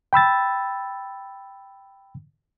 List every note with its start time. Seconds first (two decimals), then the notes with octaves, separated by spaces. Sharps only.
0.13 G5 B5 E6 A6